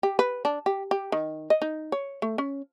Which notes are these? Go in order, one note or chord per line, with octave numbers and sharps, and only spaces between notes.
G4
B4
D4
G4
G4
D#3
D#5
D#4
C#5
A3
C#4